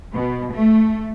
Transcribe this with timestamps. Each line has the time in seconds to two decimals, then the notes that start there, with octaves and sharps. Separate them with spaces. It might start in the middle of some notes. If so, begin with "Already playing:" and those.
0.13 B2
0.54 A3